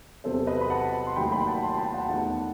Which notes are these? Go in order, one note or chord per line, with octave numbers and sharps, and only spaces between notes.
E2 C3 F#3 C4 A4 C5
B4 D#5
B5
F#5 A5
C6
D#2 D#3 F#3 A3 G5 B5
G5 B5
F#5 A5
A5 C6
A5
G5 B5
F#5 A5
E2 D#3 A3 D#4 F#5 A5